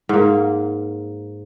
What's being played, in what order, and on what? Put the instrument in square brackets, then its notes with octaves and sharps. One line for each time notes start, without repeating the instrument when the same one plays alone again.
[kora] G#2 A#3